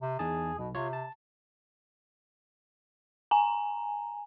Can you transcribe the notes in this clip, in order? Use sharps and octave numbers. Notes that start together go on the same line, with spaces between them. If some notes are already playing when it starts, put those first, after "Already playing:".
C3
E2 D#4 G#4 A5
B1 B2
C3 F4 C#5
A5
G#5 A#5